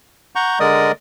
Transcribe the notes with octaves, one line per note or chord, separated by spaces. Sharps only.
F#5 A#5 C#6 G6
D3 G#3 A#4 D5 D#5 D#6